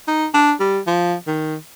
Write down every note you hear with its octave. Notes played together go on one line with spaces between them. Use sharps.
D#4
D4
G3
F3
D#3